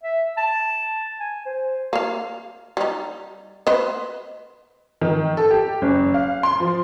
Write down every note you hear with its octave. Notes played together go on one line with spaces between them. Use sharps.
E5
A5
G#5
C5
A#3 F5
G3 D#4
B4 C5 D#5
D#3
A4
G4
F#1
F5
C6
F3